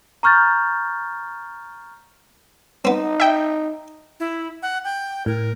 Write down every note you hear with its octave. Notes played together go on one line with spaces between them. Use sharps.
A#5 C#6 F6 G6 A6
B3 C4 D#4
E5 G5
E4
F#5
G5
A2 A#4